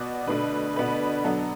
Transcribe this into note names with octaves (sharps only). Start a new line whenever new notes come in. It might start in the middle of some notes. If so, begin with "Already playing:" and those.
Already playing: B2 B3 F#4 D5
B2 D3 A3 D4 B4
B2 B3 D4 B4
F#3 B3 D4 A4